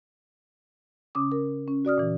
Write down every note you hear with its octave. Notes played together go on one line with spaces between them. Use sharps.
C#3 C#4 D6 D#6
A#4
C#4
F#4 D5 D#6 F6
A#2 E3